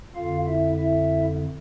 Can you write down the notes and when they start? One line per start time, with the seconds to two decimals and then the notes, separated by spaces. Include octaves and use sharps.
0.15 F2 D3 F4 F5
0.46 E4 E5
0.78 E4 E5